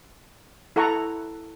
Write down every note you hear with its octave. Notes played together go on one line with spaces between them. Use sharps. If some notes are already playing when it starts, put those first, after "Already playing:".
E4 A4 F#5 A#5 C#6